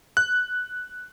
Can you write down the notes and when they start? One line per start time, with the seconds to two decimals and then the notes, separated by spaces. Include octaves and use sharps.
0.17 F#6